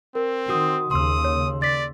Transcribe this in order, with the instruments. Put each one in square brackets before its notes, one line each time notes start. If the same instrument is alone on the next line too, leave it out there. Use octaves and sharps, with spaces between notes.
[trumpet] C4 [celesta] A#4
[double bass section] D#3 [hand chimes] F#4 D#6
[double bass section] D#2 C#3 [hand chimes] C6 E6 [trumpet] D#6
[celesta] C#5
[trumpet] D5 [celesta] A6 B6